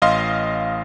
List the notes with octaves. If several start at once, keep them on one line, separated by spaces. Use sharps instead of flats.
A1 D#5 F5 C6